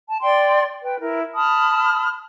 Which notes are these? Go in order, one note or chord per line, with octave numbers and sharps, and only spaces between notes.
A5
D5 G5 C6
B4 G5
E4 A#4
A5 B5 D#6 F6